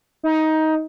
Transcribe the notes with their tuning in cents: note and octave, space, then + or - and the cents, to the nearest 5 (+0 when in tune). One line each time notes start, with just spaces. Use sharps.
D#4 +15